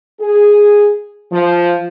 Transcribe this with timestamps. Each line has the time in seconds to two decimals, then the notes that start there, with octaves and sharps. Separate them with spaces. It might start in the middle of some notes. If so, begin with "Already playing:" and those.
0.20 G#4
1.32 F3